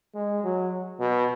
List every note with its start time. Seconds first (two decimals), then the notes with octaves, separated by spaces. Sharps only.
0.14 G#3
0.44 F#3
0.99 B2